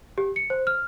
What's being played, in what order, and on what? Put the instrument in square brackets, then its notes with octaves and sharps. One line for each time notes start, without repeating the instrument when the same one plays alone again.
[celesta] G4
C#7
C5
F6